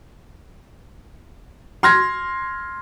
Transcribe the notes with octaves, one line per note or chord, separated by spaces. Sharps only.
C6 F6 G#6 A#6